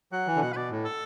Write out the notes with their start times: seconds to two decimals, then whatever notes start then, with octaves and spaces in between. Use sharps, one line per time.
0.12 F#3 F#5
0.27 E3
0.36 D3
0.42 B2 F#5
0.52 B4
0.56 B2 D5
0.71 A2
0.85 A4